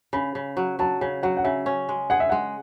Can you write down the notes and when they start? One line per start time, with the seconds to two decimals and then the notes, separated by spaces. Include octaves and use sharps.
0.13 C#3 B5
0.35 C#3
0.57 F#3
0.79 F#3 A5
1.01 C#3 G#5
1.23 F#3 F#5
1.37 F#5
1.44 C#3 E5
1.66 C#4
1.89 G#3
2.10 G#4 F#5
2.20 E5
2.29 G#3 F#5